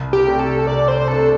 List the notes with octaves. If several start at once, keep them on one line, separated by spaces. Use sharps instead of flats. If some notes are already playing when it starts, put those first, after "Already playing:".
Already playing: C2
G4
C3 A3 D4
A4
C2 D5
C5
C3 A3 D4 A4